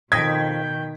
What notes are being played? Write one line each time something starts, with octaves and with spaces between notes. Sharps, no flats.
F2 B2 D#3 D#5 G5 G#6 B6